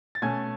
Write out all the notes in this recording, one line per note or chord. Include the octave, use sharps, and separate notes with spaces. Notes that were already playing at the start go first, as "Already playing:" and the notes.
A6
B2 A3 C#4 G#5 G#6